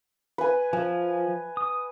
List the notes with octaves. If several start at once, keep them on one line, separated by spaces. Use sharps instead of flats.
B4 G#5
F3 G#5
D#6